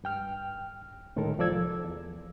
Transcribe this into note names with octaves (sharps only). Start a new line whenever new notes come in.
G2 G5 F6
D2 A2 D#3 G#3 A4 A#4
C2 F3 A4 D5 E6 G#6
E2